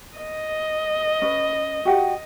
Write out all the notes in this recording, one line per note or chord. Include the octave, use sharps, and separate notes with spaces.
D#5
C#4 B4
F#4 G4 F#5